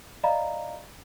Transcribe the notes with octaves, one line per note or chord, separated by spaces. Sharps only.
D5 D#5 F5 A#5 B5